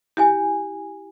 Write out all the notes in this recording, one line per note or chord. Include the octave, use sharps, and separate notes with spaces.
E4 G4 G5 G#5